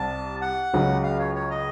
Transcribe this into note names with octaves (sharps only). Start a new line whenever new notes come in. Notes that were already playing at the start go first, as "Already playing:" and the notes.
Already playing: C2 C3 A5
F#5
C#2 C#3 F#3
F5
C#5
C#5
D#5